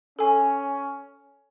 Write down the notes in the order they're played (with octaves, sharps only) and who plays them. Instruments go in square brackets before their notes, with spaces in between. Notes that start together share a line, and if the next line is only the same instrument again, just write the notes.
[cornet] C#4 [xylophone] A4 G#5